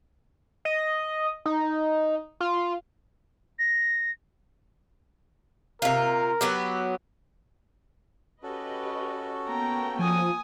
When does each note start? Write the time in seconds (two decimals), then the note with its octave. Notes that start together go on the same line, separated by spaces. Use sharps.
0.65 D#5
1.46 D#4
2.41 F4
3.59 A#6
5.82 C3 F4 A#4
6.41 F#3 B3 G4
8.43 C#4 F#4 G4 A4 B4 D#5
9.47 A#3 B3 G5 A#5
9.99 F3 G#5 D#6